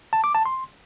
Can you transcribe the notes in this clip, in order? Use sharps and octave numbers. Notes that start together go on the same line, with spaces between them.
A5
D6
A5
C6